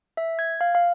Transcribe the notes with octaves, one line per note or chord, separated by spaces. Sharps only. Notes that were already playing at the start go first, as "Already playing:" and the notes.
E5
G#6
F5
F5